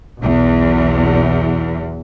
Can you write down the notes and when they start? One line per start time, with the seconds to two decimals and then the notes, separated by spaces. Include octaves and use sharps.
0.20 B1 E2